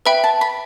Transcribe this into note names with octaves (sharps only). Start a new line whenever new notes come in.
B4 E5 G5 B5
A5
B5